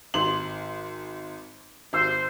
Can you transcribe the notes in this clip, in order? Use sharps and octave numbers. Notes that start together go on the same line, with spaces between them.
G#1 C6 F#7
G#1 C5 E6